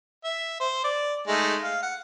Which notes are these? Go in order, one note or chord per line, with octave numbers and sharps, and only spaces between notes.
E5
C5
D5
G#3 A3 D#4
F5
F#5